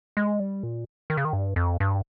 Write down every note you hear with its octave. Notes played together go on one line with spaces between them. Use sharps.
G#3
G3
A#2
D#3
C#3
D#3
G2
F2
G2